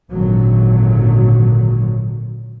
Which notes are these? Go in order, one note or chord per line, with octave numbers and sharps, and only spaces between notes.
G#1 A#2 D3 D#3 F#3